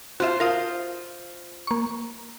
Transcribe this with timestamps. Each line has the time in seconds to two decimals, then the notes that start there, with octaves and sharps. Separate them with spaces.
0.20 F4 F#4 C5 E5
0.40 F4 A#4 C5 F5 D#6
1.67 A#3 C#6